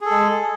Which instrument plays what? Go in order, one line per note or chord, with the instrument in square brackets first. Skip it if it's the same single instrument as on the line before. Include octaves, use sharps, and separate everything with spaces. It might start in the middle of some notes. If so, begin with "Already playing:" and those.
[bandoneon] G#4
A4
G#3